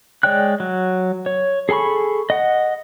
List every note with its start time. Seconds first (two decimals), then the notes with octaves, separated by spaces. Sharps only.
0.23 G#3 C#5 D5 G5 F#6
0.60 F#3
1.26 C#5
1.69 G#4 A4 G#5 B5 C#6
2.30 D#5 F#5